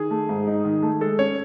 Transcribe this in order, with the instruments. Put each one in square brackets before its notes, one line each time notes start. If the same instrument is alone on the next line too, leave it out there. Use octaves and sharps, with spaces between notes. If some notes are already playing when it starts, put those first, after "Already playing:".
Already playing: [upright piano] D#3 [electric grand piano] G#4
[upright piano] A3
G#2
D#4
D#3
A3
[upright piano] G#3 [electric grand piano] A4
[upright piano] C#4 [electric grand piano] C#5